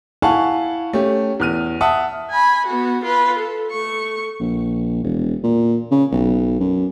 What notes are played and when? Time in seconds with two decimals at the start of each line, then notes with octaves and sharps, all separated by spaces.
0.22 E4 F5 F#5 G#5 A5 C#6
0.93 A3 C#4 G4
1.40 E2 F6 D#7
1.81 E5 F#5 A5 D#6
2.31 G#5 B5
2.66 B3 F#4
3.04 F4 B4
3.39 A4
3.71 A3 C#6
4.40 A#1
5.04 E1
5.44 A#2
5.91 C#3
6.12 B1
6.60 F#2